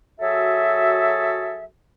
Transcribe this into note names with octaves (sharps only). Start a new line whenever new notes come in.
F#3 F#4 G#4 A4 E5